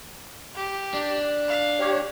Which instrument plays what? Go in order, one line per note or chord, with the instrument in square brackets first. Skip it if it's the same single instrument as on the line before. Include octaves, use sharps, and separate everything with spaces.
[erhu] G4
[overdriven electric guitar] D4
[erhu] F5
[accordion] G4 C#5